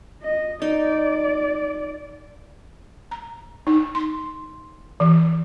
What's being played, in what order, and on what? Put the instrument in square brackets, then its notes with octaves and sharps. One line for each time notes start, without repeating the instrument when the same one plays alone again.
[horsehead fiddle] D#5
[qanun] D#4 [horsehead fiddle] D5
[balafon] A#5
D#4
C6
E3